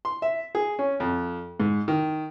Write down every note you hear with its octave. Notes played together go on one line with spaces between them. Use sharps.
C6
E5
G#4
C#4
F2
G#2
D#3